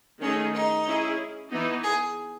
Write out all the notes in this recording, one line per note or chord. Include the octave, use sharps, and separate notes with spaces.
D#3 A3 C#4 D#4 G#4
D#4
C#4 E4 G#4
E3 B3 D#4
G#4